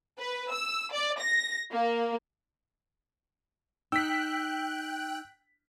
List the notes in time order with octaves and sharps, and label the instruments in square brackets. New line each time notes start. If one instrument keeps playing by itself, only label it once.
[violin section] B4
E6
D5
A#6
A#3
[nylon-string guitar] D#4 [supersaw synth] G5 F#6 [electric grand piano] E6 B6